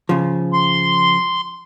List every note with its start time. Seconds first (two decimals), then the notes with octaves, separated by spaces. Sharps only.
0.09 C#3 F3
0.53 C6